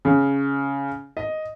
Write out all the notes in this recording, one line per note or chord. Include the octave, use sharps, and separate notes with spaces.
C#3
D#5